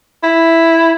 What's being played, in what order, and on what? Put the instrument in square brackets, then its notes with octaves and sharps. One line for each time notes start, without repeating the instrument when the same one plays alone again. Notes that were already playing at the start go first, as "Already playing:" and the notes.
[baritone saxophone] E4